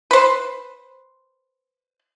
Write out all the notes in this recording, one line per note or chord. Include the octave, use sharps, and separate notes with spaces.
B4 C5